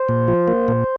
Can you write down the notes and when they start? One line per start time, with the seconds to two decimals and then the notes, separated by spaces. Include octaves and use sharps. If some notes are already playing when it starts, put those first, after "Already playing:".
Already playing: C5
0.09 A#2
0.28 F3
0.48 A#3
0.68 A#2